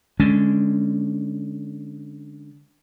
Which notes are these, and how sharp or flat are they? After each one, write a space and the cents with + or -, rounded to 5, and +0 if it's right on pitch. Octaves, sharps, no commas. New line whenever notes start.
D3 +0 G#3 +0 C#4 +10